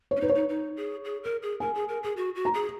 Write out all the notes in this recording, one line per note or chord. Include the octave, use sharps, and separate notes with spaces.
C#5
C#4
D#4 B4
C#5
D#4
D#4
G#4
G#4
A#4
G#4
A#4 G#5
G#4
A#4
G#4
F#4
F#4
A#5
G#4